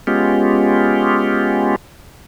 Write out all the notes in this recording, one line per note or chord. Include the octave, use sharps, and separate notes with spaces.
G#3 B3 C#4 F4 G4